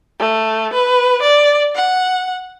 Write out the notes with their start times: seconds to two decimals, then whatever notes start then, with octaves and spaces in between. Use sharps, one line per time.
0.19 A3
0.73 B4
1.22 D5
1.75 F#5